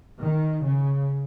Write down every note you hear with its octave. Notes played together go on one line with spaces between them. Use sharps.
D#3
C#3